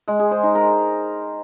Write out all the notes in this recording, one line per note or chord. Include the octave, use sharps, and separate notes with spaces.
G#3
G#4
C5
D#4
A#4